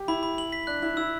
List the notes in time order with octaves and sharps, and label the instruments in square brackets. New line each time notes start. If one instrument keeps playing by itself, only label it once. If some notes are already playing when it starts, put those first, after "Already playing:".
Already playing: [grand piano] G4
[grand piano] E4 [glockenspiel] B5
[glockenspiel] B5
F#7
B6
[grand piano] D4 [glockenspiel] F#6
[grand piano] E4 [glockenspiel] F#6
[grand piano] E4 [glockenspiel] E6